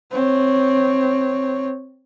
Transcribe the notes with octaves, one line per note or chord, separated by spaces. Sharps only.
C4 C#5